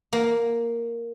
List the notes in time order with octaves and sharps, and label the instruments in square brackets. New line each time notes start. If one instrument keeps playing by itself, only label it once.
[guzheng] A#3